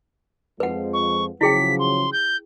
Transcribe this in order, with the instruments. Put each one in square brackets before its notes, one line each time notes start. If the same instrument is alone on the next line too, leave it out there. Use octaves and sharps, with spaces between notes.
[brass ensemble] F2 F3 G#3 [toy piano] B4 F#5
[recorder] C#6
[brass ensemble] C#3 F3 F#3 [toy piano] E4 G#4 G5 [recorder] B6
[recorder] C6
G6